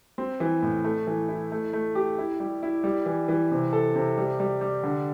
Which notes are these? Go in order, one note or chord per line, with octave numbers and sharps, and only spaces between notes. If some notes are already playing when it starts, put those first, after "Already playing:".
C4
E3
A2
A3
E3
E4
A3
A3
G4
E4
G3
E4
G3
E3
E3
C3
A4
C3
G3
G3
G3
D3